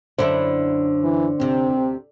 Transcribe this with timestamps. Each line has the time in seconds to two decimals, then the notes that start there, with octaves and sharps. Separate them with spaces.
0.19 F#2 D3 D4 E4 C5
1.03 E3
1.40 D2 C3 C4